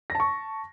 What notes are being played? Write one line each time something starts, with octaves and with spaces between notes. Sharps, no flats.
A5 C#6 A#6